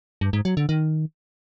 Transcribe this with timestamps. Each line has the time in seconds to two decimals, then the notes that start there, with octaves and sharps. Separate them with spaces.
0.21 G2
0.33 G#2
0.45 F#3
0.57 D3
0.69 D#3